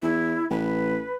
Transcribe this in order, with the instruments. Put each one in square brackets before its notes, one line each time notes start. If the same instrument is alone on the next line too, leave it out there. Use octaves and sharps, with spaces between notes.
[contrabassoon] E2 [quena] E4
[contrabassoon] A1 [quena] B4